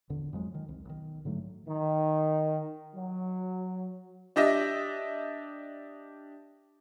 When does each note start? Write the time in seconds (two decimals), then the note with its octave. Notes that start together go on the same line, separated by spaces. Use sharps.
0.09 D#1 G#1 E2 D3
0.33 F2 F#3 G#3
0.54 D#3
0.69 C2
0.85 B1 D#3
1.25 G#2 D3 F#3 A3
1.68 D#3
2.95 F#3
4.36 D4 G4 D#5 E5